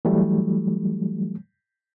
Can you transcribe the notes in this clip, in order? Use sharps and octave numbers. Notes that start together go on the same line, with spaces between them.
E3 F#3 G3 A3